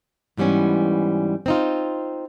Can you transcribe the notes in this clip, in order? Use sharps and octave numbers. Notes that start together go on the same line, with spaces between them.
G#2 E3 G3 B3 C#4
C4 D#4 F4